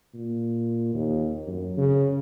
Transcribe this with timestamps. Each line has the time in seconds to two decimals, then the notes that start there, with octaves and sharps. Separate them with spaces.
0.14 A#2
0.94 D#2
1.47 F#2
1.77 C#3